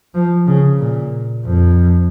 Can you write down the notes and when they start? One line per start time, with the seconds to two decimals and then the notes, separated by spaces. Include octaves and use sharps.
0.14 F3
0.47 C#3
0.79 A#2
1.45 F2